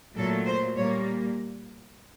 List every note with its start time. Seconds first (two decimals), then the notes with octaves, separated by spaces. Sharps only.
0.16 A#2 F#3 A3 A4
0.47 C5
0.76 A#2 G3 A#3 C#5